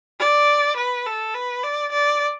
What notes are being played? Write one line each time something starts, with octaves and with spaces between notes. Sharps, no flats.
D5
B4
A4
B4
D5
D5